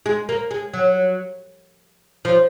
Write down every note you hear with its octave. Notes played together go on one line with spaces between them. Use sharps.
G#3
A#3
G#3
F#3
F3